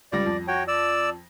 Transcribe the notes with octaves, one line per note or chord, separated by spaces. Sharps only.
C#2 G3 D5 A#6
F2
F#4 C#5 G5
D5 E6